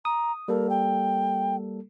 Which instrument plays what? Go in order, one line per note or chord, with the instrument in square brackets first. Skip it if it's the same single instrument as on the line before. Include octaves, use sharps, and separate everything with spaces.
[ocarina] A#5 [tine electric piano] D#6
[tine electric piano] G3 A#3 A4 [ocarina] A#4
[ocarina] G5